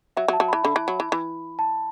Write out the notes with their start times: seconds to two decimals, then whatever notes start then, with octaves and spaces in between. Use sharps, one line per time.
0.17 F#3 E5
0.28 F#3
0.33 A5
0.40 F#3
0.48 E3 B5
0.64 D3 B5
0.76 E3
0.88 F#3
1.00 E3
1.12 E3
1.59 A5